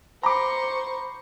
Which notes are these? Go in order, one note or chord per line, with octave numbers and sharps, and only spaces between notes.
C5 A#5 B5 C#6 D6